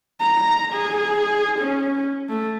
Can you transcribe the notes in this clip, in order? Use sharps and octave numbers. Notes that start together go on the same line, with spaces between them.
A#5
G#4
C#4
A3